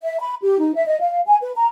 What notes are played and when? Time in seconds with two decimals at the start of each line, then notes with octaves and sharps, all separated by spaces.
0.02 E5
0.20 B5
0.42 G4
0.59 D#4
0.75 E5
0.87 D#5
1.00 F5
1.27 G#5
1.42 B4
1.55 A#5